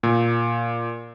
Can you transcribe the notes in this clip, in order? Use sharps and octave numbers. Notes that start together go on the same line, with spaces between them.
A#2